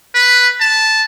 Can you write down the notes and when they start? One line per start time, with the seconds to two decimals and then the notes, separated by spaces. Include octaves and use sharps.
0.14 B4
0.60 A5